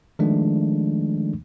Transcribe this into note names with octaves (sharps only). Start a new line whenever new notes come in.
D#3 F3 G#3 A3 D4